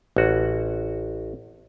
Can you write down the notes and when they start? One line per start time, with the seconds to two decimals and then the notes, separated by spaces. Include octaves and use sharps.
0.16 A1 F#4